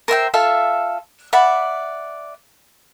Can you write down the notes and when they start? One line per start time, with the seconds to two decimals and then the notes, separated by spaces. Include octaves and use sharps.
0.08 A#4 C5 E5 G5
0.33 F4 A4 E5 F5
1.33 D5 E5 F#5 B5